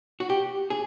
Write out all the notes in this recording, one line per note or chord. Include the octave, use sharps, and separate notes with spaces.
F#4
G4
G#4